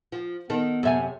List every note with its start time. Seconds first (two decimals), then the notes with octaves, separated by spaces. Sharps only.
0.12 F3
0.50 D#3 B3 A4
0.83 F#2 C3 A4 E5 G#5